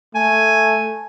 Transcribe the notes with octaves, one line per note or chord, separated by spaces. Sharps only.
A3 G#5